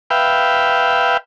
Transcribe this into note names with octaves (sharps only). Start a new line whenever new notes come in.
B4 E5 F5 G5